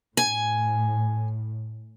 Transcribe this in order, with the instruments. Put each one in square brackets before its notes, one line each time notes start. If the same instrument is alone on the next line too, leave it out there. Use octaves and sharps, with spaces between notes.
[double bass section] A2 [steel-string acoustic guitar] G#5